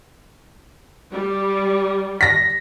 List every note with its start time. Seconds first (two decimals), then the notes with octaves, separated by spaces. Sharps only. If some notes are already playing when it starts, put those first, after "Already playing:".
1.11 G3
2.21 A#6 B6